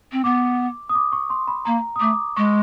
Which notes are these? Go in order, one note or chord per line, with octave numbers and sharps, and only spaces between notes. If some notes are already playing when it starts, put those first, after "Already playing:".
C4
B3 D6
D#6
D6
C#6
C6
B5
A#3 A#5
D#6
A3 D6
G#3 C#6